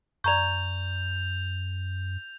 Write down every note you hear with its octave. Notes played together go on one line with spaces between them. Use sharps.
F#2 D5 A#5 C#6 G6 F7